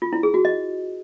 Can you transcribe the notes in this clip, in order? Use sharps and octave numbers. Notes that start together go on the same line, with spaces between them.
F4
E4
G#4
F#4
D#5